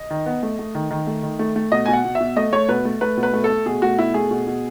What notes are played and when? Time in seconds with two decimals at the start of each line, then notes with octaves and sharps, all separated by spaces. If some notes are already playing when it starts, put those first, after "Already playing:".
Already playing: D#5
0.10 D#3
0.26 B3
0.43 A3
0.59 A3
0.75 D#3
0.91 D#3
1.07 A3
1.23 D#3
1.39 A3
1.56 A3
1.72 B2 D#5
1.86 B2 G#5
1.93 F#5
2.05 B2
2.15 E5
2.20 B2
2.36 A3 D#5
2.53 A3 C#5
2.68 B2 B4
2.85 A3
3.01 A3 B4
3.17 B2
3.23 B4
3.34 A3
3.44 A4
3.50 A3
3.66 B2 G#4
3.82 A3 F#4
3.98 B2 E4
4.14 A3 G#4
4.31 B2
4.47 B2